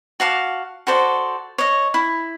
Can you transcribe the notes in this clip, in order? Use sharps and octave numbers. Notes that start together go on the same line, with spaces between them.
F#4 F5 A5 D6
F#4 A4 C5 D5
C#5 D#5
E4